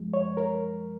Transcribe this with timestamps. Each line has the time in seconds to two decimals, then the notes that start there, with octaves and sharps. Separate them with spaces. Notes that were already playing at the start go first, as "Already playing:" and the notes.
Already playing: F#2 F3 G#3
0.14 C#5
0.37 A#4